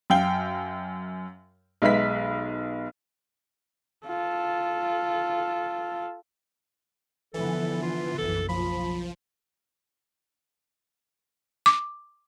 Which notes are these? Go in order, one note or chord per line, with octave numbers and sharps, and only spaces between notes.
F#2 F5 G5 G7
B1 G#3 B4 E5 B6
F4 A4
D3 E3 F3 B3 A4
F4
F#1 B1 F#2 A4
F3 B5
D6